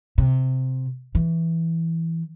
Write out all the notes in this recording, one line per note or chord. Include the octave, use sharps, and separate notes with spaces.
C3
E3